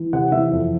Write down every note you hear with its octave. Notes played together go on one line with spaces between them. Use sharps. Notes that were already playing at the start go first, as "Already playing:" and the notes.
Already playing: E3
C3 F#5
E3 E5
F2